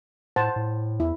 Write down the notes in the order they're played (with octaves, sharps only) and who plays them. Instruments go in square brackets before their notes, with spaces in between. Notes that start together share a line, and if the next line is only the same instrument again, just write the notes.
[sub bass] A2 [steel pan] C5 F#5 A5
[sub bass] A2
[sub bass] E2 [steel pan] E4